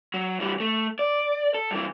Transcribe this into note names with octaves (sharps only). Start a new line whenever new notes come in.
F#3
E3 G3
A3
D5
A4
G2 E3